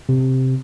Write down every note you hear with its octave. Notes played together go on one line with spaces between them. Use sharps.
C3